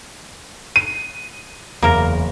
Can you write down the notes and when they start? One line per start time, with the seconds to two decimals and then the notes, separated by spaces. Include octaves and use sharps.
0.76 D#7
1.83 F#1 E2 A#3 A#4